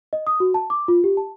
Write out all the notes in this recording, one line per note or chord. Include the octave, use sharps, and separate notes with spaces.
D#5
D#6
F#4
A5
D6
F4
G4
A5